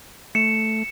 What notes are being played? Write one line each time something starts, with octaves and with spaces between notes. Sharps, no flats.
A3 C#7 E7